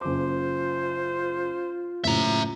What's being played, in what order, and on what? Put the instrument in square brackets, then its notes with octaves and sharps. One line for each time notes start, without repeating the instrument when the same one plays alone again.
[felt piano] F#1 D6 [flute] F4 [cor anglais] C5
[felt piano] F#1 A2 [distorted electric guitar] E5 A#5